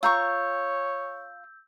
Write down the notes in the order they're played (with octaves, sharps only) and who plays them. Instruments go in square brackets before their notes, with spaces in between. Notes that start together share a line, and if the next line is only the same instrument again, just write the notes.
[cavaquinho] F4 A#5 C#6 [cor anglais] C#5 [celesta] E6 G6